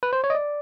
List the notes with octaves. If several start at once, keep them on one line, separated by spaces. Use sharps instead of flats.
B4
C5
C#5
D#5
D5